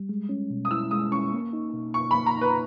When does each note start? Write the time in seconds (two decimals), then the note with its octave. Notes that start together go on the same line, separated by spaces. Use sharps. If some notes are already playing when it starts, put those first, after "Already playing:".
Already playing: G3
0.09 G#3
0.29 C#4
0.50 B2
0.65 D#6
0.71 E4 E6
0.91 G#3 D#6
1.12 C#4 C#6
1.33 A#3
1.53 D#4
1.74 B2
1.94 B2 C#6
2.11 B5
2.15 A#3
2.26 A#5
2.37 D#4 B4